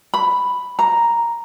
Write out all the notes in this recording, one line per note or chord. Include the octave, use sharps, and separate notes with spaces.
B5
A#5